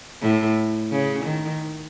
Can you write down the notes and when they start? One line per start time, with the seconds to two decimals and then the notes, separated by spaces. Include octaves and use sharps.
0.22 A2
0.91 C#3
1.25 D#3